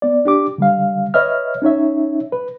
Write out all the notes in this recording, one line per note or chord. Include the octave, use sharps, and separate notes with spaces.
B3 D5
D4 G4 D6
D3 G3 F5
B4 C#5 D#5 E5 F6
C#4 D#4 C#5 E5
B4